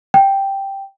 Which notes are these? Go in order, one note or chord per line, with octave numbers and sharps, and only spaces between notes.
G5